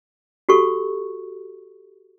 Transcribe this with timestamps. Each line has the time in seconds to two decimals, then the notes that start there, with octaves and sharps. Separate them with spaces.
0.49 F#4 G4 A4 C#6